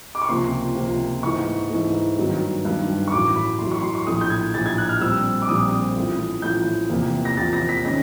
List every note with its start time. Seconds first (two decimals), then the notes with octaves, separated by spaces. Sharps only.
0.15 D6
0.22 C#6
0.28 C#2 C3 F3 A#3 C6
0.75 C#2 C3 F3 A#3
1.23 G#2 E3 A3 C#6
1.70 G#2 E3 A3
2.17 G2 D#3 F#3 B3
2.65 G2 D#3 F#3 B3
3.08 C#6
3.12 A1 A2 F#3 D6
3.36 B5
3.59 A1 A2 F#3 C6
3.72 C#6
3.82 C6
3.95 C#6
4.06 A#1 A2 F3 A3 D#6
4.21 G6
4.30 G#6
4.54 A#1 A2 F3 A3 A6
4.66 G#6
4.78 F#6
4.89 F6
5.01 A#1 A#2 G3 C4 E6
5.42 D6
5.48 A#1 A#2 G3 C4 D#6
5.96 A1 A2 F3
6.42 A1 A2 F3 G6
6.90 E2 C3 F3 A#3
7.25 A#6
7.37 E2 C3 F3 A#3 A6
7.53 A#6
7.69 B6
7.84 D#3 G#3 C#4 A#6